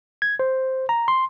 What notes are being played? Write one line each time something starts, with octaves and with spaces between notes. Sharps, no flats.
G#6
C5
A#5
C6